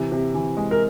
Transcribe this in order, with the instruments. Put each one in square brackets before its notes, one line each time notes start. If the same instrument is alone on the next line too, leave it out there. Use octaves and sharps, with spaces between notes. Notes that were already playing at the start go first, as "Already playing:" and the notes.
Already playing: [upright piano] C3 E3
C3
E3
G#3
[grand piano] A#4